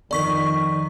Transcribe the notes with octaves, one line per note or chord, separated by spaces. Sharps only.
F2 D#3 D5 C#6 B6